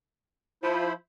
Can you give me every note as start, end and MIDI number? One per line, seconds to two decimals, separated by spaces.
0.63 0.90 53
0.63 0.93 64
0.63 0.93 72
0.63 0.93 83